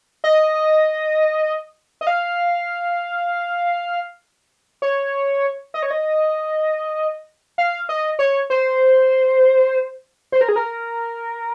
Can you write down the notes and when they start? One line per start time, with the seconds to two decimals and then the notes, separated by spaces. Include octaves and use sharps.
0.24 D#5
2.01 D#5
2.07 F5
4.82 C#5
5.74 D#5
5.83 C#5
5.91 D#5
7.58 F5
7.89 D#5
8.19 C#5
8.50 C5
10.32 C5
10.41 A#4
10.48 G#4
10.56 A#4